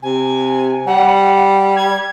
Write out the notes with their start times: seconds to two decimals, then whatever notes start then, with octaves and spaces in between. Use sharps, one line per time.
0.02 C3 G#5
0.87 G3 F#5
1.76 G#6